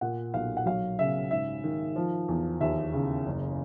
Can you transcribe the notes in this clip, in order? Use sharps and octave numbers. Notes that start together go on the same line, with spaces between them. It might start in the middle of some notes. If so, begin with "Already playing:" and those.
A#2 F#5
B1 F5
F#5
F#3 F5
C#3 E5
G#2 E5
D#3
F3
E2
D#2 E5
C#3
F#1